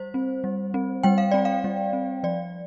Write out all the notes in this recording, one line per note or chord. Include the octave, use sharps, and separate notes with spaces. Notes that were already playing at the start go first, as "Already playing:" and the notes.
Already playing: G3 C5
C4
G3
C4
G3 G5
F5
C4 D5
F5
G3
C4
F3 D5